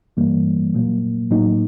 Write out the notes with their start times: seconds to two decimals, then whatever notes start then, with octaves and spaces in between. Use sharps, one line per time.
0.17 G2 E3 G3 A#3
0.74 A#2 F#3 A#3
1.31 A2 F#3 A#3 D#4